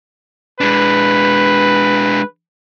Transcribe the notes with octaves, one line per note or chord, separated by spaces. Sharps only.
G#3 D4 B4